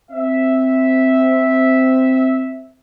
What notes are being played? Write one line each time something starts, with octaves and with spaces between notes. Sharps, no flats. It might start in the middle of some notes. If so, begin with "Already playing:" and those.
C4 E5